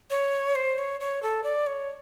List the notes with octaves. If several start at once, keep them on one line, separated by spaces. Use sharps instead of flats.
C#5
C5
C#5
C#5
A4
D5
C#5